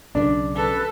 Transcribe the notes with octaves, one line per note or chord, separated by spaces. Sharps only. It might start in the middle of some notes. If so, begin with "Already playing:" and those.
B1 C#3 D4
A4 B4